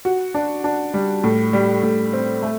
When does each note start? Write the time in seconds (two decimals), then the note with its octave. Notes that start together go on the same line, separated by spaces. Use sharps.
0.05 F#4
0.34 D4
0.64 D4
0.94 G3
1.24 A2
1.53 G3
1.83 A2
2.13 C4
2.43 A3